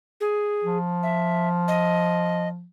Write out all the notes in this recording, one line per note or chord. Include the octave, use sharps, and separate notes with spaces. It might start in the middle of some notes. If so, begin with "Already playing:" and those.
G#4
F3
E5
D#5